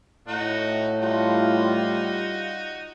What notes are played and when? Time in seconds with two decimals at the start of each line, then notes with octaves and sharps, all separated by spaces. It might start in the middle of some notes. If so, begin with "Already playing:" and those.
0.28 A2 D#4 F#4
1.01 G3 D#4 F4 F#4